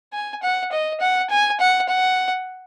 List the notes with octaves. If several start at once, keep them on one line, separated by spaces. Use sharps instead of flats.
G#5
F#5
D#5
F#5
G#5
F#5
F#5